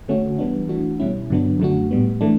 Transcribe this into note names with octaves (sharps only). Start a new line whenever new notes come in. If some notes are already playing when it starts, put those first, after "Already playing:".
D3 A3 C#4 F#4
E3 G3 B3 D4
E3 A3 D4 F#4
B2 G3 C#4 E4
G2 D3 F#3 B3 D4
F#2 D3 A3 D4 F#4
A2 G3 B3
E3 A3 D4